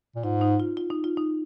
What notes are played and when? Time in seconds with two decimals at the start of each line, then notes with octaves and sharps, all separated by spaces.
0.16 A#2
0.24 G#2 F4
0.41 D#4
0.60 F4
0.77 F4
0.90 D#4
1.04 F4
1.17 D#4